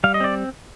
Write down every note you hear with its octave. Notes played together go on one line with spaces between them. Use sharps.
G3 F5
D#5
C4 D5